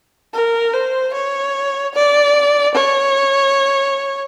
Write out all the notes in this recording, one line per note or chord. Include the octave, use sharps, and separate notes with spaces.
A#4
C5
C#5
D5
C#5